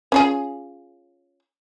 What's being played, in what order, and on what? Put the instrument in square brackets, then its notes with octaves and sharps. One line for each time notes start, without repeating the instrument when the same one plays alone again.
[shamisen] C#4 F4 G#4